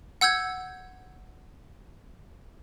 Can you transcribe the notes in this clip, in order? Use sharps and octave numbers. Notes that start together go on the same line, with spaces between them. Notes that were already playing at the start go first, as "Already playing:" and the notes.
F#5 E6 G6 G#6